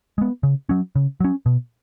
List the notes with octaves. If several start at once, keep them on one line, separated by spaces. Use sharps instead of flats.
G#3 B3
C#3
F#3 C#4
C#3
F#3 C#4
B2